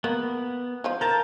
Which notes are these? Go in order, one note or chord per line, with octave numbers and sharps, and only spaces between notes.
A#3 B3
F3 F4
A4 A#4 F5 A5 A#5 G6